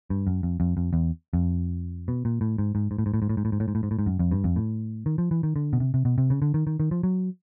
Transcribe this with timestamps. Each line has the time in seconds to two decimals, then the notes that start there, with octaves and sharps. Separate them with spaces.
0.10 G2
0.27 F#2
0.43 F2
0.60 F2
0.77 F2
0.93 E2
1.33 F2
2.08 B2
2.25 A#2
2.41 A2
2.58 G#2
2.75 G#2
2.91 G#2
2.98 A2
3.06 G#2
3.14 A2
3.22 G#2
3.29 A2
3.37 G#2
3.45 A2
3.52 G#2
3.60 A2
3.68 G#2
3.75 A2
3.83 G#2
3.91 A2
3.99 G#2
4.06 F#2
4.19 F2
4.31 G2
4.44 F2
4.56 A2
5.06 D#3
5.18 F3
5.31 E3
5.43 D#3
5.56 D3
5.73 B2
5.80 C3
5.94 C3
6.05 B2
6.18 C3
6.30 C#3
6.42 D3
6.54 D#3
6.67 D#3
6.80 D#3
6.91 F3
7.03 F#3